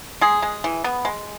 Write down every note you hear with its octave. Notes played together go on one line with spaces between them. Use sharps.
G#3 G#4
G#3
E3
B3
G#3